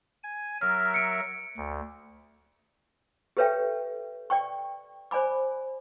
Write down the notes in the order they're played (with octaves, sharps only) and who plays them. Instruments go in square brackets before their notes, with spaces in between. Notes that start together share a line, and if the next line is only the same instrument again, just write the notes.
[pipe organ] G#5
[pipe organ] F#3 A#4 E5 [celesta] F6
[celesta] C#7 D7
[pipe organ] D2
[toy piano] G4 A4 B4 C#5 E5 G5
D5 G5 C#6
C5 D5 G#5 B5 D6